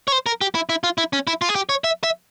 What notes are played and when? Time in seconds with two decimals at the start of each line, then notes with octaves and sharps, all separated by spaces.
0.08 C#5
0.12 C5
0.26 A#4
0.41 G4
0.55 E4
0.69 E4
0.84 F4
0.98 E4
1.13 C#4
1.27 E4
1.42 F4
1.49 G#4
1.55 G4
1.69 C#5
1.84 E5
2.04 E5